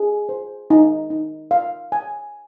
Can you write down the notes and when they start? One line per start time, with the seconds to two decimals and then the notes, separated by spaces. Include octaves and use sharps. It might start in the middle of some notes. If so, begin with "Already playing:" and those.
Already playing: G#4
0.29 C5
0.70 D#4
1.10 D#4
1.51 F5
1.92 G#5